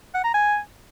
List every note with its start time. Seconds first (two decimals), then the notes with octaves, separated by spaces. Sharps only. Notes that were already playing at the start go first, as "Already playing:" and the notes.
0.14 F#5
0.24 A#5
0.34 G#5